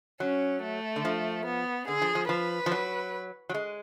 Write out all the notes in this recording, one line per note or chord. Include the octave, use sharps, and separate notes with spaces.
F#3 C#4
A3
D3
F3
B3
D3 G#4
F3
F3
F3 B4
F3
F#3
F#3
G#3